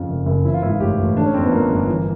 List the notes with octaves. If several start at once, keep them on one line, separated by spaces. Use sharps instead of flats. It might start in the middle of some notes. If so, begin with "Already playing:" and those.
Already playing: F2 C#3 F4
F#1
F#1
E3 E4
F4
G#2 E4
F4
A1 G4
A1
D3 D4
C#4
F2 C4
B3
F3 A#3
G1
E3